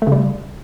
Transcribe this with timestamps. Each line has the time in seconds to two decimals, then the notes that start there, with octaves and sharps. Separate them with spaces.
0.02 A3
0.07 C#3
0.12 G3